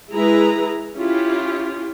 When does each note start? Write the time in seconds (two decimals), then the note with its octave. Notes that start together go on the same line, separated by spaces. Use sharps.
0.11 G#3 E4 G#4 B4 A#5
0.96 C#4 E4 F4 G4